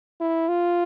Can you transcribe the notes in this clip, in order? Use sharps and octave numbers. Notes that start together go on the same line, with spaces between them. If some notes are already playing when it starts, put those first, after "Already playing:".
E4
F4